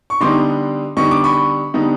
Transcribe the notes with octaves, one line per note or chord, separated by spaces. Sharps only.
C#6
D3 G3 B3 D#4 C6 D6
D3 G3 B3 D#4 C#6
D6
B5 C#6
D3 G3 B3 D#4